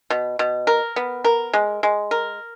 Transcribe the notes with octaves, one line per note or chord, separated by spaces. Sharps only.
B2
B2
A#4
B3
A#4
G#3
G#3
A#4